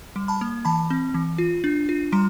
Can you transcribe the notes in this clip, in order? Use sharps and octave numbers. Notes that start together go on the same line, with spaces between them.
G3
A5 B5
A#3
E3 A5 B5
C4
E3
F4
D4
F4
G3 A#5 C6